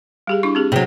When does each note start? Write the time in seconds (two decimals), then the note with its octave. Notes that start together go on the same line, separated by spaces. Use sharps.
0.27 G3 G4 G#4
0.43 D4 E4 C#6
0.55 C4 G4 G#4
0.72 C3 F#3 G#4